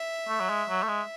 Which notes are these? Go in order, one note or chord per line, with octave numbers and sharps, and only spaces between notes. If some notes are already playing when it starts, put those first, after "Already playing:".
Already playing: E5
A3
F#3
G#3
F#3
A3
G#3